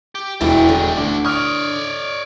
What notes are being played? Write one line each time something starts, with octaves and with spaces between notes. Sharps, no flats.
G4
E1 E3 G3 G#3 E4
D3
D2 A3 D4
C#5 D5 D#6 F6